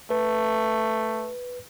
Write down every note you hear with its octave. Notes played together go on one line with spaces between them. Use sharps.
A3 B4